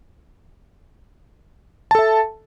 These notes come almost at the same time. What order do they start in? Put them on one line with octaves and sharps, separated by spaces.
A5 A4 E5